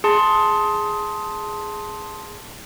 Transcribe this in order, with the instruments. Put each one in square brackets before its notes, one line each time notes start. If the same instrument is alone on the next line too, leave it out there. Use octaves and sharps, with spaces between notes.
[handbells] G#4 A5 C6